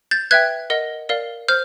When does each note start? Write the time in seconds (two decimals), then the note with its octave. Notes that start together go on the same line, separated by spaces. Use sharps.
0.11 G6 A6
0.31 B4 E5 G5 F#6 G#6
0.70 A#4 D#5 F#5
1.09 A#4 D5 F5
1.48 C5 F6 G6